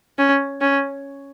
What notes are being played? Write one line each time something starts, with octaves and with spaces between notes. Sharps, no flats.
C#4
C#4